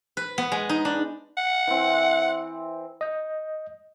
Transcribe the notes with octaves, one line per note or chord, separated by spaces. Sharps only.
B4
B3
G#3
D#4
D4
F#5
E3 C4
D#5 G6